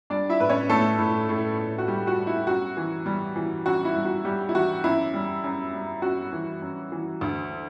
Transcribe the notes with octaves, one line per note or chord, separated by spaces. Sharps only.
G3 D4 D5
E4 E5
A2 B4
C#4 C#5
A2 A3 A4
A2
A2
A2
F#4
G3 G4
F#4
G3
E4
F#2 F#4
E3
G3
E3
F#2 F#4
E4
G3
F#4
G3 G4
E4
E3 F#4
F#2 E4
G3
F#2
G3
F#2 F#4
E3
F#2
E3
D2